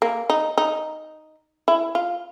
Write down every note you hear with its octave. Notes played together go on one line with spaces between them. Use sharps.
A#3
D#4
D#4
E4
F4